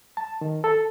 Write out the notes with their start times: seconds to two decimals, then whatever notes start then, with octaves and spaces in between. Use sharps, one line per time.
0.17 A5
0.41 D#3
0.64 A4